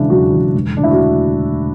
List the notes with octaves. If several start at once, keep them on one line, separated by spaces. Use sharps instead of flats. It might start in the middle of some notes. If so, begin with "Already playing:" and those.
Already playing: E1 E2 C#3 D4 E4
E1 F#3 F#4
E2 C#3
E1
D2 D3 D4
E4
F#4